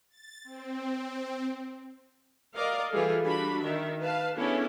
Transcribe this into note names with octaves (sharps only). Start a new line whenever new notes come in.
A6
C4
A#4 D5 D#5 F5
E3 G3 F4 G#4 A4
G3 D4 F#4 B5
D#3 E5
B4 F5 A5
B3 C#4 D4 E4 G#4 A4